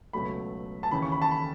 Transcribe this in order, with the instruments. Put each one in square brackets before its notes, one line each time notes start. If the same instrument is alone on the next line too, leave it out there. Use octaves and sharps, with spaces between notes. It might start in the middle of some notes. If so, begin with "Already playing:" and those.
[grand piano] C#2 B2 F#3 A3 B5
A5
D#2 C#3 E3 B5
C#6
B5
A5
B5